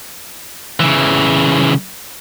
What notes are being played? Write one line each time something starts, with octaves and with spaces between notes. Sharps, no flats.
C#3 E3